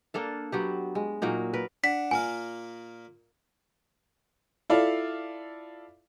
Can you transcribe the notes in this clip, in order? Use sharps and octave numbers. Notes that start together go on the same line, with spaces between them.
A#3 D4 A4 F5
F#3 B3 G4
G#3
A#2 F#3 A#3 D#4
A#4 B4
D4 F#5 B6
A#2 A#3 F5 G#5
E4 F4 A4 D5 F5